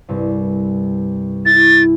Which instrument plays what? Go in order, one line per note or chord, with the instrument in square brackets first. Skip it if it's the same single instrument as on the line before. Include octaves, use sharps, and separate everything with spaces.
[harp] C2 G2
[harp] E4 [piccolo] A6